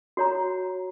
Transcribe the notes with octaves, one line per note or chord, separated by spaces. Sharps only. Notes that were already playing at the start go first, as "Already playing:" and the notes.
F#4 C#5 A#5